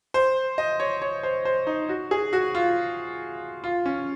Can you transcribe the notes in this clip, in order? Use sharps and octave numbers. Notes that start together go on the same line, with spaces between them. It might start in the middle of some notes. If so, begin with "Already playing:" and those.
C5
D#5
C#5
C#5
C5
C5
D#4
F#4
G#4
F#4
F4
F4
C#4